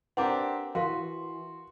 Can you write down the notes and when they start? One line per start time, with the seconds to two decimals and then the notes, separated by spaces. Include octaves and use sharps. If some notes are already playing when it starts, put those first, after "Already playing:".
0.17 C4 D4 G4 A#4 B4 F#5 A#5
0.75 E3 F#4 A#4 F5 C6